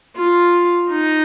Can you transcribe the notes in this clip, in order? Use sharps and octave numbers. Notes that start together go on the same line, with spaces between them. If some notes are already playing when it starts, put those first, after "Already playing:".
F4
D#4